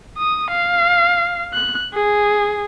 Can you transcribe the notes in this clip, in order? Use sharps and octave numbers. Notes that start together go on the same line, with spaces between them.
D#6
F5
F#6
G#4